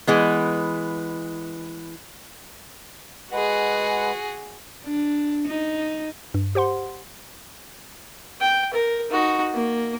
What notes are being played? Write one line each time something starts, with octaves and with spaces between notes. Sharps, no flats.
E3 G#3 B3
G#3 F#4 G#4 B4 F#5
D4
D#4
G2
G4 C5 F#5 C6
G5
A#4
D#4 F#4
A#3